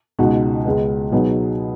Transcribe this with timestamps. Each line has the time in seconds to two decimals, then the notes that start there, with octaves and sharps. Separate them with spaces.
0.19 C#2 B2 G#3 D#4 F#4
0.65 C#2 C#3 G#3 B3
1.12 B2 F#3 B3 D#4 G#4